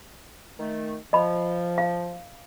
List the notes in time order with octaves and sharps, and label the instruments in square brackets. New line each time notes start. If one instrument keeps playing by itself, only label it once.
[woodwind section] D#3 A3
[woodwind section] F3 [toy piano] D#5 B5
[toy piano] F5